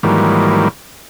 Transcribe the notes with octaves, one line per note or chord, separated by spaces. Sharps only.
G#2 D#3 E3 F#3 G3 A#3